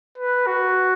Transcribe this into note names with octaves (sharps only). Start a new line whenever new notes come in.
B4
F#4